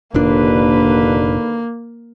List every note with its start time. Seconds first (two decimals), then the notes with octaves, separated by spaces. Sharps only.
0.14 F1 D#2 A#2 D3 A#3 D4 B4